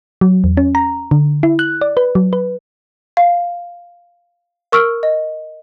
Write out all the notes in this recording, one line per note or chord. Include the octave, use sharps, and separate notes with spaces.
F#3
E2
C#4
A#5
D3
E4
F#6
D5
B4
F#3
B4
F5
A#4 C#6 E6 F6 D7
D#5